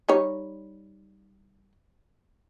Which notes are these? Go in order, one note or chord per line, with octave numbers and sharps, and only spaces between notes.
G3 D#4 C#5